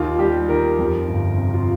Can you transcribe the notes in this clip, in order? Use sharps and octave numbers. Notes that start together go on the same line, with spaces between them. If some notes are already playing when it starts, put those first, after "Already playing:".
Already playing: D#2 D#3 F4
G3 G4
D#3 A#4
F2
G1
C3
F4